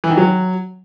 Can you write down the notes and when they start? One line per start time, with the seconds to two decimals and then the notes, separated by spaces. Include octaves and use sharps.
0.04 E3
0.11 D#3
0.17 F#3